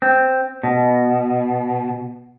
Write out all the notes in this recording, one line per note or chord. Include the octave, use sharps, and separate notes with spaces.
C4
B2